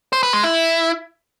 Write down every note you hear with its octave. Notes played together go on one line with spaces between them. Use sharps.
C5
B4
G#3
E4